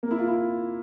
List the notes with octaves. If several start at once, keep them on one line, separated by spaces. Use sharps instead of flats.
A#3
E4
F4
E4